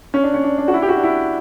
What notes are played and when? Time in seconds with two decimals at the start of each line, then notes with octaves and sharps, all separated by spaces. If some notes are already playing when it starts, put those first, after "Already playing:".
0.14 C#4
0.24 D4
0.34 C#4
0.43 D4
0.58 D4
0.68 F#4
0.74 E4
0.82 G4
0.89 F#4
0.97 D4
1.03 E4